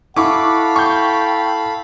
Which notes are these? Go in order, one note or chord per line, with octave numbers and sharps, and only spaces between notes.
E4 A4 F5 F#5 B5 C#6 D6
G5 C#6 G6